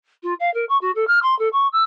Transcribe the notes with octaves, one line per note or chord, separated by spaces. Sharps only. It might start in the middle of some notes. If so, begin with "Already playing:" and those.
F4
F5
A#4
C#6
F#4
A4
F6
C6
A4
C#6
E6